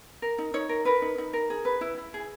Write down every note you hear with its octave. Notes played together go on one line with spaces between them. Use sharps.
A#4
D#4
D#4 C#5
A#4
A#4 B4
D#4
D#4
A#4
G#4
B4
E4
E4
G#4